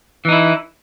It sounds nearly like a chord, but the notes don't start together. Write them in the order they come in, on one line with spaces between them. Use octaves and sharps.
E3 D#4 E4